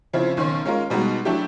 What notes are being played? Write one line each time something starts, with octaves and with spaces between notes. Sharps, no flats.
C#3 F3 C4 E4 F4
B1 D#3 C#4 C6
G#3 C#4 F4 A#4
B2 G3 G#3 D#4 F#4
F#3 A3 D4 E4 G4